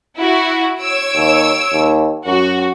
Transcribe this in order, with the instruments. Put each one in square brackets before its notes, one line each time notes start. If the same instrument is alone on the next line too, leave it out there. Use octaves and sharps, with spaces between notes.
[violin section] E4 F#4
C#5 E6 D7
[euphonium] D#2
D#2
[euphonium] F#2 [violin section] F#4